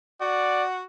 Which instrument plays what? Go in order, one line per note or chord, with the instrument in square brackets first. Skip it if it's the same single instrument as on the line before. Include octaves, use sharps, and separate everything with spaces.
[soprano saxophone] F#4 [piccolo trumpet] D5 [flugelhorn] F#5